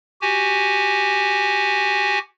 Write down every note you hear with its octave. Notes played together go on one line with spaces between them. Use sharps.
F#4 G4 G#5